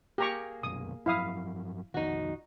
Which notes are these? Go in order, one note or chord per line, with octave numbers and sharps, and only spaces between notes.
A#3 G4 G#4 A#5 C#6
C2 F#2 B2 D#6
G2 F3 F#3 E4 F5 D#6
B1 F2 D#3 D#4 F#4